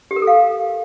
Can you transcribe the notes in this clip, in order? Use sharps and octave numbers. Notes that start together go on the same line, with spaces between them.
G4
A#4
A4
F5